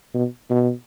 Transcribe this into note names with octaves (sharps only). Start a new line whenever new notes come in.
B2
B2